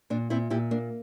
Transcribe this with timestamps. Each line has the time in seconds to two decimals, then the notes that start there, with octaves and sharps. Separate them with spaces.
0.10 A#2 D4
0.30 A#2 C4 E4
0.50 A#2 E4 G4
0.71 A#3 D4